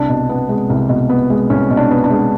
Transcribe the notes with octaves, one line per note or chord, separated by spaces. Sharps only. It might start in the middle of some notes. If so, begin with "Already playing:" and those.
Already playing: C2 D4
B2
B3
G#3
C2
B2
B3
G#3
C2 C#4
B2
D4
B3
D4
G#3